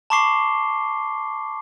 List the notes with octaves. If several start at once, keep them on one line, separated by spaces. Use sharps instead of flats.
A5 B5 C#6 D6 C7 G7